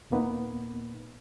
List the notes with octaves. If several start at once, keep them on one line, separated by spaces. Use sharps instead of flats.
D#2 A#2 A#3 B3 D#4 B4